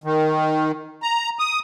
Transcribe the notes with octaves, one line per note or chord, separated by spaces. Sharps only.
D#3
A#5
D#6